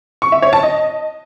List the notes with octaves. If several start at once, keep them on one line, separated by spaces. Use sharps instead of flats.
C#6
E5
C#5
A5
D#5